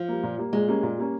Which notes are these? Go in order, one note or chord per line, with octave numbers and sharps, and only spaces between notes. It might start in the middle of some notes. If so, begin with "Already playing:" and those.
Already playing: F3
G3 A#3
A#2
G3 A#3
A#2 G#3
G3 A#3 C#4
A#2
G3 A#3 C#4